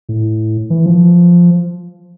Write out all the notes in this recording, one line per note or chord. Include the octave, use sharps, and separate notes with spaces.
A2
E3
F3